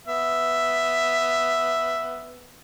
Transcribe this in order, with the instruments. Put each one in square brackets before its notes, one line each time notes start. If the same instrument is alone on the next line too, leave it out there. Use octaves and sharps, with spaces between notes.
[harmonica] B3 E5